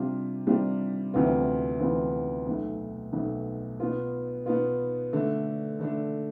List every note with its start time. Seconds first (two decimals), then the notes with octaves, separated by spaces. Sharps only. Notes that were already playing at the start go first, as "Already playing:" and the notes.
Already playing: C3 G3 D4 F4
0.47 C3 G3 D4 F4
1.14 D2 C3 E3 B3 F4
1.80 D2 C3 E3 B3 F4
2.47 B1 B2 A3
3.13 B1 B2 A3
3.80 B2 B3 F4
4.46 B2 B3 F4
5.13 D3 A3 D4
5.79 D3 A3 D4